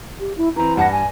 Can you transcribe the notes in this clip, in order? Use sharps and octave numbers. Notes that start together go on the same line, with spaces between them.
G4
E4
E3 C4 A#5
G2 F#5 A5 A#6
G#5